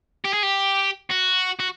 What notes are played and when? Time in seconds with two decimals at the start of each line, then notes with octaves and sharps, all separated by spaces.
0.25 G4
0.33 G#4
0.43 G4
1.10 F#4
1.59 F#4